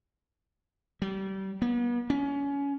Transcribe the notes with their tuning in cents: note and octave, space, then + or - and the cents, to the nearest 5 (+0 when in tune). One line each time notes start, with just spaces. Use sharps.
G3 -30
B3 -40
C#4 +25